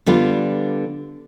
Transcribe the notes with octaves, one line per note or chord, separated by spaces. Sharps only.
D3 G3 B3 F4